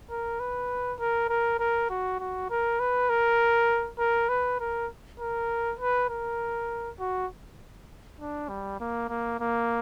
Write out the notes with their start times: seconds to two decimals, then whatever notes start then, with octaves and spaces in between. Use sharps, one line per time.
0.10 A#4
0.40 B4
1.00 A#4
1.29 A#4
1.59 A#4
1.90 F#4
2.20 F#4
2.50 A#4
2.80 B4
3.09 A#4
3.99 A#4
4.29 B4
4.60 A#4
5.20 A#4
5.79 B4
6.09 A#4
6.99 F#4
8.19 D4
8.49 G3
8.80 A#3
9.09 A#3
9.40 A#3